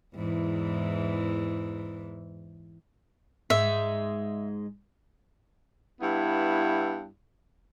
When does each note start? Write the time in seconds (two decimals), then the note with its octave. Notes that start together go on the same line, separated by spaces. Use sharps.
0.15 E2 G#2 E3
3.50 G#2 G#3 E5
6.01 G2 B3 E4